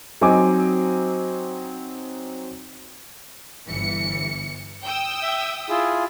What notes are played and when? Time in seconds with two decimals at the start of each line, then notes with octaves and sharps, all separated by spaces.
0.21 F#3 C4 D#4 G#5 D6
3.68 G1 E3 C#7
4.85 G5 D#6 E6
5.23 E5
5.69 E4 F4 G#4